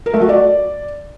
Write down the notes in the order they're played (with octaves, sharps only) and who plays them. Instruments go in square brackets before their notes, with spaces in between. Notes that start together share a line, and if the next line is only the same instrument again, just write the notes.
[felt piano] A#4
A3
F#4
D5